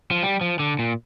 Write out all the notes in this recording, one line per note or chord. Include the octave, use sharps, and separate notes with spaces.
F3
G3
F3
D3
A#2